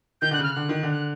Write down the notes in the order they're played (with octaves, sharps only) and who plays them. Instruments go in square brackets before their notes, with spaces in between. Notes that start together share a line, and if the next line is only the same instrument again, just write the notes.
[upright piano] D#3 [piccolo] G6
[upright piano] D3 [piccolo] F#6
[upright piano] C#3
[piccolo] F6
[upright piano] D3 [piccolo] F#6
[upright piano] D#3
D3
[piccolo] F#6